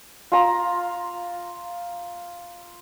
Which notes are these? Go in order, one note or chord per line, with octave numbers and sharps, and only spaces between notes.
F4 A#5